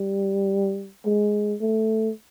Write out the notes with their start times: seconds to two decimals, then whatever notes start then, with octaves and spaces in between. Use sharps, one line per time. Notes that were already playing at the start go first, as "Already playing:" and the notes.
Already playing: G3
1.05 G#3
1.61 A3